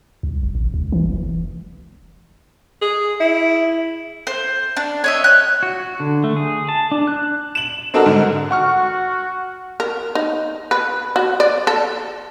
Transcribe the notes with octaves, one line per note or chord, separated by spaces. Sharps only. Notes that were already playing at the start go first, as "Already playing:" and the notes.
C2
E1
A1
C#2
E3
F1
G#4
E4
C5
D4
C#5 D#5 E5
F#6
F#4
D3
A3
G#4
A5
D4
F#6
E7 F#7
C4 D4 D#4 F#4 A4 A#4
G#2 D3
F#4 F#5 C#6 F6
A#4
D#4
B4
F#4
D5
A4